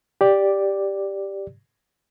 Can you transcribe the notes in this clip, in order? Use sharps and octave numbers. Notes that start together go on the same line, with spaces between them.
G4 D5